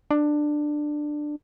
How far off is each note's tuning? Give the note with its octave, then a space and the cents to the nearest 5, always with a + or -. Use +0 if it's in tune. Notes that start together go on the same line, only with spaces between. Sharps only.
D4 +15